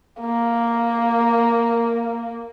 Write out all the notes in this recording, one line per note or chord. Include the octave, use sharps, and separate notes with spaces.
A#3